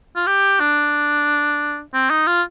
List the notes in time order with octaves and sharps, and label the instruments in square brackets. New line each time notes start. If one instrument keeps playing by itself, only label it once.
[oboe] F4
G4
D4
C4
D#4
F4